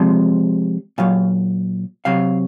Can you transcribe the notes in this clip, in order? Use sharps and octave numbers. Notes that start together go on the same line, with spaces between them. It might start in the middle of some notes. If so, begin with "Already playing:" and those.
Already playing: C3 F3 G#3
A#2 F#3 F5
C3 F#3 F5